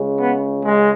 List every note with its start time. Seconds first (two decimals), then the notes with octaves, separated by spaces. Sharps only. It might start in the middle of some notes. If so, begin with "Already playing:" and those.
Already playing: C#2 C#3 G#3
0.17 B3
0.63 G#3